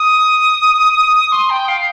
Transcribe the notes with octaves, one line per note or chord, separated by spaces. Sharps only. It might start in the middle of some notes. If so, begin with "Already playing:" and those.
Already playing: D#6
C6
G5
F5